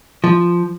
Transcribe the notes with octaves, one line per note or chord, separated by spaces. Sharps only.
F3